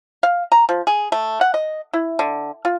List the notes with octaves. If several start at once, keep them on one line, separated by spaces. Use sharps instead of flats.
F5
A#5
F3
G#4
A3
F#5
D#5
E4
D3
F4